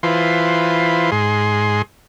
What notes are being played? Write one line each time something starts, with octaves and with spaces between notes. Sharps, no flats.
E3 F4 B4 C5
G#2 G#4 C6